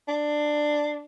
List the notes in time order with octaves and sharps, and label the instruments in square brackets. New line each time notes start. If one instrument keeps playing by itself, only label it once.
[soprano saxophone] D4